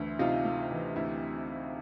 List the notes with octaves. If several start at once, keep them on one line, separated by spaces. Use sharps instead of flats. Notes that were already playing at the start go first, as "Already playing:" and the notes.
Already playing: D2 E3 E4
C3 D#4 F4
A3
E3
D2 E4